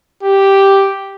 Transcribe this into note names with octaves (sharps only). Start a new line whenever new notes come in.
G4